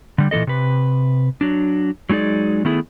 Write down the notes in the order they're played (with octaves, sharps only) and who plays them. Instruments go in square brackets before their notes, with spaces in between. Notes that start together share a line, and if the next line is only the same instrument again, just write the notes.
[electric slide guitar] D3 G3
A#2 E3 G#3 A4 D#5
C3 B4
F#3 D4
F#3 G#3 D#4 G#4 D5
D#3 A3 B3 E4 G#4